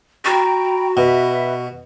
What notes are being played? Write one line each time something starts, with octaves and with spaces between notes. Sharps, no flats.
F#4 G5 A#5 B5
B2 B4 E5 B5